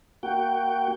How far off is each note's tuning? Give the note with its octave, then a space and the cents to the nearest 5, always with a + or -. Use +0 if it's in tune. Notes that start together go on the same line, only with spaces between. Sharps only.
A#3 +0 F#4 +15 G5 +0